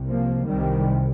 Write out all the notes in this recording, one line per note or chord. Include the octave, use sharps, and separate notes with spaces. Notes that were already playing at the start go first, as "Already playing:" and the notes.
Already playing: C2 C3
F3 A#3
C2 C3 D#3 G3